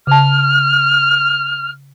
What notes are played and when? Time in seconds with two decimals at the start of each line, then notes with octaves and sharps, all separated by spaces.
0.07 C#3 A5 F6